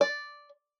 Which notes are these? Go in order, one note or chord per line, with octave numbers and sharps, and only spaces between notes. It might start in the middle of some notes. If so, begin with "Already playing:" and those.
D5